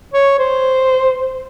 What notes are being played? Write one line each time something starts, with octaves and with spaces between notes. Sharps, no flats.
C#5
C5